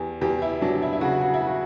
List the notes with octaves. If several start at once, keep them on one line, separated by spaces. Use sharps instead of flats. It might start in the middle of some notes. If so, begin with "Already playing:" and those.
Already playing: E2 G4
E2 G4
E4
F#3 D4
E4
E4
C#3 F#4
F#4
E4
F#4